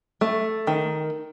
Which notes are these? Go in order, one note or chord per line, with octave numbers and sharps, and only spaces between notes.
A3
D#3